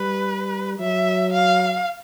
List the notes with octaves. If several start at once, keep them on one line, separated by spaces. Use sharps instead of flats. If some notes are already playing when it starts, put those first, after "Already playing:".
Already playing: G3 B4
F#3 E5
F5